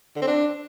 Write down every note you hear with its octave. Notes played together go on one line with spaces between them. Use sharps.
D3
C4
D4